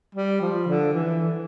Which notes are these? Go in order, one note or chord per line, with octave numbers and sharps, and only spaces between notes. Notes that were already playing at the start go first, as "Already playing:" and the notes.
G3
F3
D3
E3